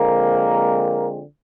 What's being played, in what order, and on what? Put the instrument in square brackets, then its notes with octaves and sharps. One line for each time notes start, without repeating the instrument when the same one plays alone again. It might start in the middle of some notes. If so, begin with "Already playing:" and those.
Already playing: [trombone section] D3 F3 G#3 A#3 C4 A#4